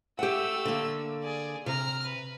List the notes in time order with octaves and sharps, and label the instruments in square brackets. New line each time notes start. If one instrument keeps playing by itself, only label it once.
[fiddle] A3 E6 [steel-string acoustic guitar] G4 F#5
[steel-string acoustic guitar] D3 A#3
[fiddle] G#4 D5
[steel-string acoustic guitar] C3 [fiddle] A#5 F6
[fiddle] B4